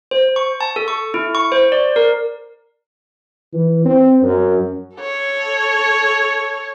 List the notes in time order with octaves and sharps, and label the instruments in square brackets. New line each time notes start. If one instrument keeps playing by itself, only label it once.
[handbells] C5
C#6
A5
A4
C#6
E4
C#6
C5
D5
A#4
[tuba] E3
C4
F#2
[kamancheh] A4 C#5